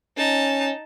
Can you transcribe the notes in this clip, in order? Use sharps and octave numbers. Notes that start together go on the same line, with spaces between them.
C#4 D#4 A5